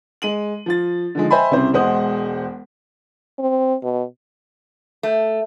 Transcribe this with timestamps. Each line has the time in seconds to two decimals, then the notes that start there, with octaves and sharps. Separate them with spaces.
0.22 G#3 D#7 F#7
0.66 F3 F4 A6
1.15 D3 D#3 F3 G#3
1.31 C5 D#5 E5 G5 G#5 B5
1.51 C2 C#3 C4 E4 C5
1.73 E1 G#3 C5 F#5 D#6
3.39 C4
3.83 B2
5.03 A3